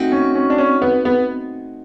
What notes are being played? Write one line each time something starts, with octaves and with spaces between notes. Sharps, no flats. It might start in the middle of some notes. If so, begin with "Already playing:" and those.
Already playing: A3 C4 D#4 F#4
C#4
C#4
D4
C#4
B3
B3